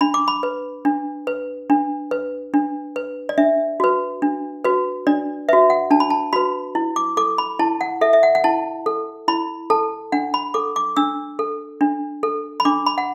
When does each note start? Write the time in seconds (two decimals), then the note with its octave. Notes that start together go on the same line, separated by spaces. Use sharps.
0.01 D4 B5
0.14 D6
0.28 B5
0.43 B4
0.85 D4
1.27 B4
1.70 D4
2.11 B4
2.54 D4
2.96 B4
3.29 D5
3.38 D4 E5
3.80 F#4 B4
4.22 D4
4.64 F#4 B4
5.07 D4 D5
5.49 F#4 B4 E5
5.70 F#5
5.91 D4 A5
6.00 B5
6.10 A5
6.33 F#4 B4 B5
6.75 E4
6.96 D6
7.17 A4 D6
7.38 B5
7.59 E4 A5
7.81 F#5
8.01 A4 E5
8.13 E5
8.23 F#5
8.35 F#5
8.44 E4 A5
8.86 A4
9.28 E4 B5
9.70 A4 A5
10.12 D4 F#5
10.34 B5
10.54 A4 D6
10.76 D6
10.97 D4 E6
11.39 A4
11.81 D4
12.23 A4
12.60 B5
12.65 D4 D6
12.86 B5
12.98 F#5